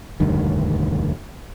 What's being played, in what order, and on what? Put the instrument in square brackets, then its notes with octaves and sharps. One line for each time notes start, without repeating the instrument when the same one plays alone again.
[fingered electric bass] E1 D2 G2 D#3